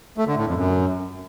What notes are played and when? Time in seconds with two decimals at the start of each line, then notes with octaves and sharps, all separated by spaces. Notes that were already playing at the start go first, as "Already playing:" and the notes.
0.18 A3
0.27 D3
0.37 A2
0.47 F2
0.57 F#2